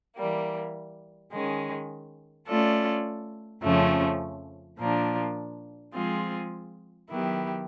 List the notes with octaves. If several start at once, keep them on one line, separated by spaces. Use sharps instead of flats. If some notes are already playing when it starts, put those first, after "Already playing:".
E3 G3 A#3
D#3 G#3 C#4
A3 C#4 F4 A4 D5
F2 C#3 F3 A3 C#4
A#2 F3 A#3 D4
F3 G#3 C4 F4 G#4
D#3 F#3 B3 E4 G4